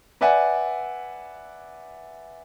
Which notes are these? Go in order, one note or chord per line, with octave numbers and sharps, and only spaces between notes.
B4 D5 E5 F#5 G#5